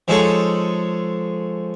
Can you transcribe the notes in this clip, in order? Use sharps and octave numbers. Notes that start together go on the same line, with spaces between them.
F3 G#3 D#4 G#4 A4 C#5